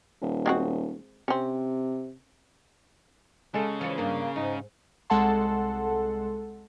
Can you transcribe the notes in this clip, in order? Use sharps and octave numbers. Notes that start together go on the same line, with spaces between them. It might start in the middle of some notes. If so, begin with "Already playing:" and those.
D#1
G#3 C4 F#4
C3 C4 C#4
C#3 G#3 A4
E3 F4 C#5
G2 A#3 D4
G#2 D#4
C2 G#3 A4 F#5 A5 C6